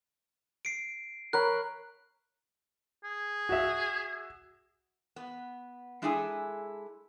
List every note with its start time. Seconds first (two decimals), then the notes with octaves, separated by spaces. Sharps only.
0.65 C7 D7
1.33 A#4 C#5 B5 F#6
3.04 G#4
3.49 F#4 E5
5.16 B3
6.02 G#3 D4 E4 G#4 A4 G#5